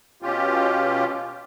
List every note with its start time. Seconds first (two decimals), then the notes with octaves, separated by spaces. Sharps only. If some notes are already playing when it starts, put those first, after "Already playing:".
0.22 B2 C#4 F4 G4